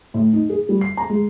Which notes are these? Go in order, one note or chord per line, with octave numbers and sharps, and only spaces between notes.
A2
D#4
G#4
G3
C7
A#5
G#3